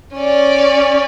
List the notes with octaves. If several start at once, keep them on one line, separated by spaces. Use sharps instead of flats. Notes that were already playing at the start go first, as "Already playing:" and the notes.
C#4 D5